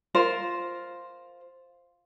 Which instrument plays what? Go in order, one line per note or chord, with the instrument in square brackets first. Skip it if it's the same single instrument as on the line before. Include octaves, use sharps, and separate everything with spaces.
[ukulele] F4 A#4 C5